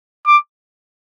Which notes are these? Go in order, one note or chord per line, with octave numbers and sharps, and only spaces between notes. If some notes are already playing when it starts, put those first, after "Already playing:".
D6